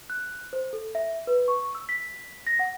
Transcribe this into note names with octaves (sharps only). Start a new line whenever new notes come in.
F#6
C5
A4
E5
B4
C#6
E6
B6
A#6
F#5